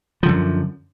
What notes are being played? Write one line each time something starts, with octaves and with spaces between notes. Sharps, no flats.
F#2 D3 F3